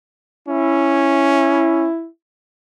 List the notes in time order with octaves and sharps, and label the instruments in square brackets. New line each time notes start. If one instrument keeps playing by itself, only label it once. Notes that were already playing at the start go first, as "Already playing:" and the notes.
[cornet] C#4 [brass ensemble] E4